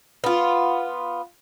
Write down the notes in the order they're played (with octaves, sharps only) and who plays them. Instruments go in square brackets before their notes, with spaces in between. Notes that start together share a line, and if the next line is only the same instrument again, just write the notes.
[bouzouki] B3 F4